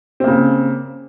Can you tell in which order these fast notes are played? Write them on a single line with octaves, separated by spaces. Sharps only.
C4 A#3 C#3